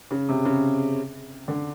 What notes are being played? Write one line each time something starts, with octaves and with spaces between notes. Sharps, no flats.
C#3
C3
C#3
D3